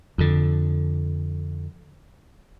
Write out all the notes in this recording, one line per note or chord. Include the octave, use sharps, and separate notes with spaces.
F2 D3